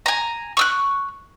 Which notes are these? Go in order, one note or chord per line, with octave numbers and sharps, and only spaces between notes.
G#5 A#5
C#6 E6 F#6